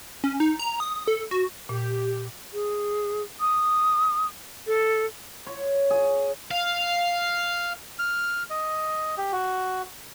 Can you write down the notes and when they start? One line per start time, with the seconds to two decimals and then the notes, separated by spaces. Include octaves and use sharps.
0.24 C#4
0.40 D#4
0.59 A#5
0.80 D#6
1.08 A4
1.31 F#4
1.69 A#2 G4
2.53 G#4
3.40 D#6
4.67 A4
5.47 C#5
5.90 G#4
6.51 F5
7.99 F6
8.50 D#5
9.18 G4
9.32 F#4